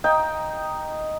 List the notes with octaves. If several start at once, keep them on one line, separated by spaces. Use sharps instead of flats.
D#4 G5